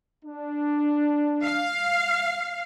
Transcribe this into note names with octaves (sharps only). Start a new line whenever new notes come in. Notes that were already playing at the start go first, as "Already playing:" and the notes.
D4
F5